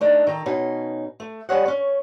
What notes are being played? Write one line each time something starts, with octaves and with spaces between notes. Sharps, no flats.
A3 D4 D#4
D#3 A4 A#5
B2 C#4 D#4
A3
G3 C#4 G#4 C#5 D#5 F#5
C#4 C#5